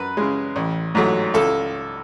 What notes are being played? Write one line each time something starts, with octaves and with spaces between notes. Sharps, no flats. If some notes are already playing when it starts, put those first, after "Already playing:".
Already playing: F#2 B4
C#3 G#3
A1
G#2 F#3 A3
C#2 A4